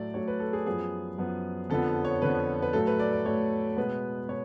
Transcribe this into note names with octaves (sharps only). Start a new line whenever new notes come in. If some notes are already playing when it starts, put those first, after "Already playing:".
Already playing: A2 F#3 A3 D5
A2 F#3 A3 C#5
B4
A4
G#4
F#2 F3 B3 G#4
F#2 F3 B3
F2 D3 F3 B3 A4
C#5
F2 D3 F3 B3 B4
B4
A2 F#3 A3 A4
B4
D5
D5
A2 F#3 A3 C#5
B2 G#3 B3 B4
B2 C#5